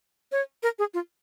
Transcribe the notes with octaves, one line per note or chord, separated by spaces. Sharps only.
C#5
A#4
G#4
F4